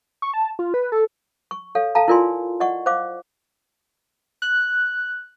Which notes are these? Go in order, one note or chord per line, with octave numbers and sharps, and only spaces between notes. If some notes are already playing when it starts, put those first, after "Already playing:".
C#6
A5
F4
B4
A4
C#6
A4 C#5 F5
A4 F5 A5 A#5
E4 F4 A#4 D5 G#5 C6
D5 D#5 F#5 C#6
C5 F5 D6
F#6